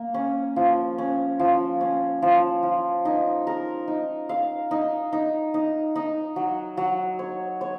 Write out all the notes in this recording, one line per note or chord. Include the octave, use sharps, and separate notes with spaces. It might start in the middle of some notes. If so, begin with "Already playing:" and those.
Already playing: A#3
C#4
F3
C#4
F3
C#4
F3
F3
D#4
A#4
D#4
F5
D#4
D#4
D#4
D#4
F#3
F#3
C#5
C#5